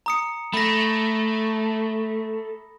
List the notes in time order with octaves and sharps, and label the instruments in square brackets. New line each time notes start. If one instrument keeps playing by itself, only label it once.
[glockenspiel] A#5 D#6 C#7
[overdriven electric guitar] A3 [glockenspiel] B5 A#6